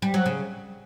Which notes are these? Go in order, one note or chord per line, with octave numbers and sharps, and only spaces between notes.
G3
F#3
C#3